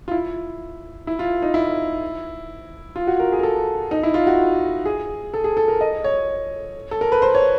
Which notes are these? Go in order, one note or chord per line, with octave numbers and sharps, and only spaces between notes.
F4
E4
E4
F4
D#4
E4
F4
F#4
A#4
G#4
A#4
A4
D#4
E4
F4
F#4
G#4
A4
G#4
A4
A#4
D#5
C#5
A4
A#4
B4
C5
C#5